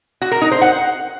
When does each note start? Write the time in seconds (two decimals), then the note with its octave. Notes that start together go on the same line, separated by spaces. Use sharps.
0.22 F#4
0.32 A#4
0.42 D#4
0.51 C5
0.61 F#5